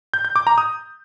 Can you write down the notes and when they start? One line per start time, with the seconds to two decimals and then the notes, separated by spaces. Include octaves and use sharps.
0.14 G6
0.25 G6
0.36 D6
0.47 A#5
0.58 D#6